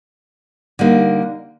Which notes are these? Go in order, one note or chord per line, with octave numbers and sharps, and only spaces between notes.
D3 G3 A#3 D#4